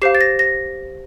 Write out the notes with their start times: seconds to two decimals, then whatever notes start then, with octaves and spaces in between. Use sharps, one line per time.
0.02 G4 C5 F5 C7
0.15 A6
0.21 A#6
0.39 A#6